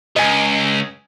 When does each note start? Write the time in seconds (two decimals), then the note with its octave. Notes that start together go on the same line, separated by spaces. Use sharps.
0.16 C#2 D#5 G#5